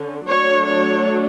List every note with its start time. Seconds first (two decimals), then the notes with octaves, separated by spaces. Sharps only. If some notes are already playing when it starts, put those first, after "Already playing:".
Already playing: D3 C#4
0.26 F#3 A3 D4 C#5
0.70 C#5